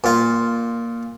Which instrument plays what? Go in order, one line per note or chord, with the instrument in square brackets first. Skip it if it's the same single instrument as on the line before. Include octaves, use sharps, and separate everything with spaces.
[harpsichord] A#2 F4